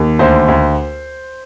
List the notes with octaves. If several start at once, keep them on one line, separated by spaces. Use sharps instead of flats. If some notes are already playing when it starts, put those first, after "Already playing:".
Already playing: D#2
D2 C5
D2